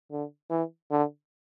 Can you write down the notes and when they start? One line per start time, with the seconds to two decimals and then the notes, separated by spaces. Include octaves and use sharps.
0.12 D3
0.50 E3
0.91 D3